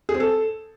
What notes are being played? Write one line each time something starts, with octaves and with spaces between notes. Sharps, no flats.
G#4
C4
A4